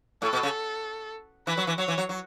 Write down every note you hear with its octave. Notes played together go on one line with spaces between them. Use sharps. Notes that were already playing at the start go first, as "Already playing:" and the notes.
A2 A4
B2
C#3
E3 B4
F#3
E3
F#3 C#5
E3
F#3
F#3